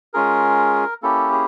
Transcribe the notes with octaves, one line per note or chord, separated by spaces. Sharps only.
G#3 C#4 F4 G#4 A#4
A#3 C#4 E4 G4 A4
G#4